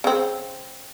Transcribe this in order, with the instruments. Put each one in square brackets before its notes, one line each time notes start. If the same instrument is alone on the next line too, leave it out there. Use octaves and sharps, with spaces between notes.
[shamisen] C#3 C4